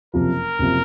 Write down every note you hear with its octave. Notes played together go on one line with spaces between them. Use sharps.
F#1 F2 C3 F3 A#4
F#1 C3 F3